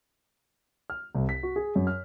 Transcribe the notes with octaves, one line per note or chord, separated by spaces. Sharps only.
F6
C2
B6
F#4
G#4
F#2
F6